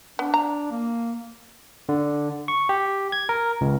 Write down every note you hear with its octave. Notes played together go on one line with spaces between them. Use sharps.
B3 D4
A#5
A#3
D3
C#6
G4
G#6
A#4
C#2